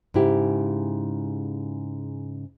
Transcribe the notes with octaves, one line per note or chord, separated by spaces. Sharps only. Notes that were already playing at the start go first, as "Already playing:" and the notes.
G#2 C#3 E4 G4